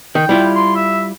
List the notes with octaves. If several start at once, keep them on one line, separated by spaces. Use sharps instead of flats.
D#3 G5
G3 E4 F4
C6
E5